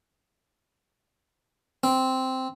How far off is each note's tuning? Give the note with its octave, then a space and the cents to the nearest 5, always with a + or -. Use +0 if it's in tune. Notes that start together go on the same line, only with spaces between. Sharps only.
C4 -5